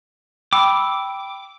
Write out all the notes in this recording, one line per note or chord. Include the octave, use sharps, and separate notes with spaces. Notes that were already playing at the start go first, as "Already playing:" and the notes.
G5 B5 D6 E6